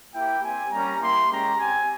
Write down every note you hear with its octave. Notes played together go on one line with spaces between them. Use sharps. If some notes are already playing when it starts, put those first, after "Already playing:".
A#3 E4 G4 G5
C4 G4 G#5
G3 A#3 C#4 A#5
A#3 E4 G4 C6
G#3 C#4 G4 A#5
C4 G4 G#5